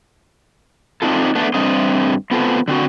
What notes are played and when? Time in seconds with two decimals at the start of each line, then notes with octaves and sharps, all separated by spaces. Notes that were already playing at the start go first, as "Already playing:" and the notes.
1.02 C4 D4 D#4 F4 A4
1.35 A3 B3 D4
1.54 G2 D3 A3 C4 D#5
2.31 B3 C4 F4 A4
2.68 D3 C4 F#4